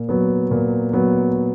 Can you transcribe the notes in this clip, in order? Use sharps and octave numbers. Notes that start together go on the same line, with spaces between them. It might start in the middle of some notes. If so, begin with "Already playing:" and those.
Already playing: A#2
F#3 B3
A#2
F#3 B3